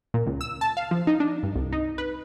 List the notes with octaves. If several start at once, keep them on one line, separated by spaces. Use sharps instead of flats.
A#2
C#2
E6
A5
F5
F3
D#4
D4
G2
C2
D#4
B4